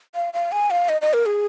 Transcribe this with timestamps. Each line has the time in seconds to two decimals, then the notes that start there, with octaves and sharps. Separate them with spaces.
0.15 F5
0.33 F5
0.52 G#5
0.71 F5
0.89 D#5
1.01 D#5
1.13 A#4
1.26 G#4